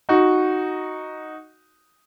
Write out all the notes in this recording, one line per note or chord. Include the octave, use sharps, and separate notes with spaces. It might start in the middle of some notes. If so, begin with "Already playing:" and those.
D#4 F#4